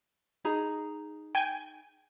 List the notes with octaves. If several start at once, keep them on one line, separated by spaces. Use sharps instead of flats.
D#4 G#4 A#5
G5 G#5